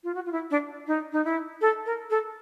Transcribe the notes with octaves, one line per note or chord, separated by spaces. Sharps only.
F4
F#4
F4
E4
D4
D#4
D#4
E4
A4
A#4
A4